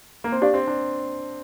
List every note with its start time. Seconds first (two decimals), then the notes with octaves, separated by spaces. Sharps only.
0.24 A#3
0.32 C4
0.42 D4 G4 D5 F5
0.54 C4
0.67 D4